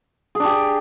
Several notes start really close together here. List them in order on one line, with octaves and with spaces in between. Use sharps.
G#4 D4 G4